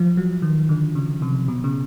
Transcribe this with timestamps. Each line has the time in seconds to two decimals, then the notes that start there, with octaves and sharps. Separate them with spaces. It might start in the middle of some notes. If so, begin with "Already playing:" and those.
Already playing: F3
0.17 F#3
0.42 D#3
0.69 D3
0.95 C#3
1.22 C3
1.48 B2
1.64 C#3